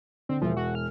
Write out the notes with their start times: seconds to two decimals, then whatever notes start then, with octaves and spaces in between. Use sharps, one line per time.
0.29 D3 C4
0.42 E1 F3 E5
0.57 F#4
0.75 F6